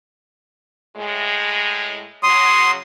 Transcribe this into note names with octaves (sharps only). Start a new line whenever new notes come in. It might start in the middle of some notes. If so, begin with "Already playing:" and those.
A2 G#3
C#3 F#3 C6 D#6